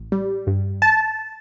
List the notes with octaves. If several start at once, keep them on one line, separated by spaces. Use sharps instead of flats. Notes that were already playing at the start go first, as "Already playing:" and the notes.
Already playing: A1
G3
G2
A5